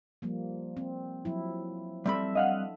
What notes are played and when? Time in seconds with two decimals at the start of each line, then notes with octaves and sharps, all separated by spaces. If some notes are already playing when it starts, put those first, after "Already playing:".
0.22 F3 G3 A#3
0.77 C4
1.25 F3 F#3 E4
2.06 G3 C4 A4 E5 B5
2.35 D4 D#5 F5 F#5